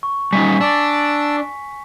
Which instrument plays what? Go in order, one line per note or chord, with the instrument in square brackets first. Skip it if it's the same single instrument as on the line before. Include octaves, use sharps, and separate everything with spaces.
[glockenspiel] C#6
[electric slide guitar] G3 C#4 D#4 [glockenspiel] G#5 B6 C#7
[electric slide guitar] D4 [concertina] D5 A5 E6